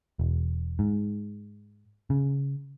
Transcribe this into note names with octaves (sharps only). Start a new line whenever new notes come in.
E1
G#2
C#3